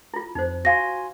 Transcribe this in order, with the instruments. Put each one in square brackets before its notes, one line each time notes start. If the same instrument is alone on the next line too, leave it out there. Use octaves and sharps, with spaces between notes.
[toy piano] E4 F4
[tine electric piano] F2 [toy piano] D#4 C5
[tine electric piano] F#4 G#5 C6 [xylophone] F5 A#6